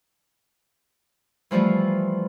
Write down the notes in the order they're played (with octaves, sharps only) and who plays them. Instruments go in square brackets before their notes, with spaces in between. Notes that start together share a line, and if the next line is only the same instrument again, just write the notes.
[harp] E3 F3 G3 A3 F4